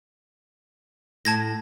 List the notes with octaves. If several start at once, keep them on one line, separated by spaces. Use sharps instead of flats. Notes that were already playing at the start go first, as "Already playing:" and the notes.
A2 A5 G#6 A#6